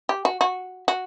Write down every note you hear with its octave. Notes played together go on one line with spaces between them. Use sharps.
G4
F#4
F#4
F#4